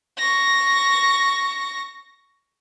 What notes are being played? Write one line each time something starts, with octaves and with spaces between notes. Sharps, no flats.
C#6 A#6